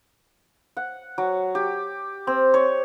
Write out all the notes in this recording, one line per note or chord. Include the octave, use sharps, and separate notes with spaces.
F#5
F#3
G4
C4
C#5